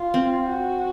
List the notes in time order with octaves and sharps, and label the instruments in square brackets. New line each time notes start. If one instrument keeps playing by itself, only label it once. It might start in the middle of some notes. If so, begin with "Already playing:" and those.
Already playing: [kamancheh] F4
[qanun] C4
[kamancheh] F#4